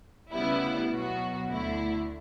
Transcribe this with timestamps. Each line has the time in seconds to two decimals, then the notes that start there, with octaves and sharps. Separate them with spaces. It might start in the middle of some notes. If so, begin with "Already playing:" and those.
0.33 D2 C#3 G3 B3 E4
0.90 B2 F#3 B3 F#4
1.48 D2 D3 A3 E4